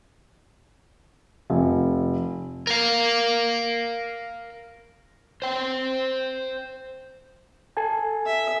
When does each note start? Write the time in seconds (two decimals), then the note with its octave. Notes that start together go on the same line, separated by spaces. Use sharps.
1.50 F1
2.67 A#4 F5
5.42 C5 G5
7.77 A4 G#5 A5
8.26 E5